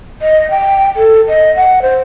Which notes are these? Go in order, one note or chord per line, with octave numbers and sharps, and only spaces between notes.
D#5
G5
A4
D#5
F#5
C5